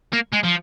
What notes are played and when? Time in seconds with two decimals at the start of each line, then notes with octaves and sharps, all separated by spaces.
0.13 A#3
0.32 G#3
0.43 F3